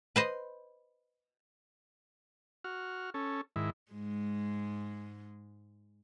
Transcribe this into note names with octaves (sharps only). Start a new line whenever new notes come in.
B4 C5 D#5
F#4 F6
C#4 A4
G#2 D#3 E4
G#2 G#3